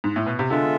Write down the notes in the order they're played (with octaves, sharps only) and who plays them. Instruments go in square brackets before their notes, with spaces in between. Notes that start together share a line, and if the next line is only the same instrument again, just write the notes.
[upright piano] G#2
A2
B2
C3
[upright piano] D3 [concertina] G#3 B3 F4 A4 E5